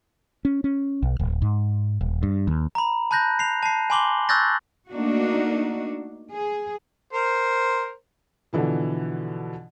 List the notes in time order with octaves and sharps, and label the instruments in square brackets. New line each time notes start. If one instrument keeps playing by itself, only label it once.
[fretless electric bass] C#4
C#4
B1
D1
G#2
D#1
G2
D#2
[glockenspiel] A#5 B5
A5 B5 F#6 G6 A#6
C7 F7
A5 C7
G#5 B5 C6 D6 F#7 G7
C#6 E6 F#6 G6 A6 A#6
[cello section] A3 A#3 D4 D#4 F#4
G#4
[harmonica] A#4 C5
[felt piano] B2 D3 E3 F3